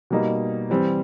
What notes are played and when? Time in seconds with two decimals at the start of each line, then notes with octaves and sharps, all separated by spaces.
0.10 B2 G3 A#3 D#4
0.70 E3 G3 C4